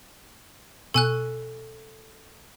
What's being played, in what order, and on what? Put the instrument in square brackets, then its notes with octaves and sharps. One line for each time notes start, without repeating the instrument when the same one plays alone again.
[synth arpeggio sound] B2 C#6 [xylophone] A4 G#5 F#6